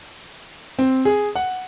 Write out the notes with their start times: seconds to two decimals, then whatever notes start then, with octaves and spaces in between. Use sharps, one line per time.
0.79 C4
1.05 G#4
1.35 F#5